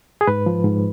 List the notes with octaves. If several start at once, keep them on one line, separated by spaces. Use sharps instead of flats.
G#4
G#2 B4
F3
G#2